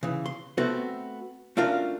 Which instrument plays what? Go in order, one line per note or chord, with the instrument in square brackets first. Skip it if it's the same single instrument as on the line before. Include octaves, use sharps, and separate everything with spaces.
[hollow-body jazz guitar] C#3 E3
C6
A3 B3 C4 F#4 A4
A3 C#4 D4 F4 F#4 A#4